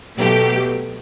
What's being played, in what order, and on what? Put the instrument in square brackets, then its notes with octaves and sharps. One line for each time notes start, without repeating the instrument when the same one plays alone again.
[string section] B2 F#3 A3 G4